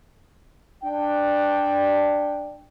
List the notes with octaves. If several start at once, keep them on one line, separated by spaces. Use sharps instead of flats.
D4 G5